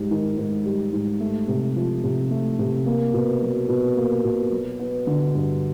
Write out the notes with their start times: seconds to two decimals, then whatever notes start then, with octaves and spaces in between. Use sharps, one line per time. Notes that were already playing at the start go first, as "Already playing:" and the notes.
Already playing: G#2 G3
0.11 D#3
0.38 G#2
0.66 G3
0.93 G#2
1.20 A3
1.48 C3
1.76 F3
2.04 C3
2.30 A3
2.59 C3
2.86 A#3
3.14 B2
3.42 F#3
3.69 B2
3.97 A#3
4.24 B2
4.51 F#3
4.79 B3
5.07 D3
5.35 G2